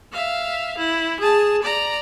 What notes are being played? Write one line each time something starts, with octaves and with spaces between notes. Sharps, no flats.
E5 F5
E4
G#4 A5
D5 A#5